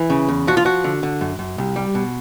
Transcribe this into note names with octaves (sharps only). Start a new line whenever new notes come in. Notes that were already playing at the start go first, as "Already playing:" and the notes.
Already playing: E3
C#3
E2
F3 F#4
F4
F3 F#4
D3
D3
F#2
F#2
C2
G3
B2